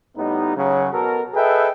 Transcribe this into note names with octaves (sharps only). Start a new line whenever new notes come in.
A2 G3 B3 D#4
F#2 C#3 F#3
B2 A4 A#4
G#4 A4 B4 D#5 E5 G5